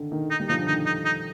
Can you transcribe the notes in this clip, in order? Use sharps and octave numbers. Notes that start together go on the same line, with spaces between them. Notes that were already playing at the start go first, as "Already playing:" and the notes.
Already playing: D3 D#3
D#3
D#4
D#3 G3
D3 F3 D#4
D3
D#3 D#4
D#4
D#4